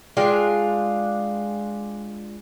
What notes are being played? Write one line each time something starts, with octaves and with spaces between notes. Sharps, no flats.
G#3 D4 F4 G5